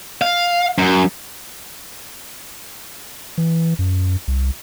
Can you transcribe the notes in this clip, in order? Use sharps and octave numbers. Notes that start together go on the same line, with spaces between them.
F5
F#2
E3
F#2
C2